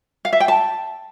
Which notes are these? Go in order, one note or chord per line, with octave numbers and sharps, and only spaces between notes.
F5
E5
G5
A5